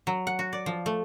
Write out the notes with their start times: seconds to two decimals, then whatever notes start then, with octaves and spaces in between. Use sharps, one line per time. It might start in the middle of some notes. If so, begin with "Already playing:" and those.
0.07 F#3
0.27 F#5
0.39 F#4
0.53 D5
0.66 F3
0.86 A3